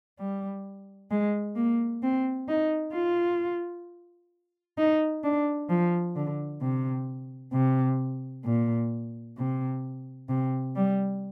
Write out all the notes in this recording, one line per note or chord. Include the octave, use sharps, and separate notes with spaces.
G3
G#3
A#3
C4
D#4
F4
D#4
D4
F3
D3
C3
C3
A#2
C3
C3
G3